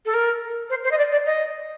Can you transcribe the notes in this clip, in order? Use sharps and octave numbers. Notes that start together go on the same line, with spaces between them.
A4
A#4
C5
C5
D#5
D5
D5
D#5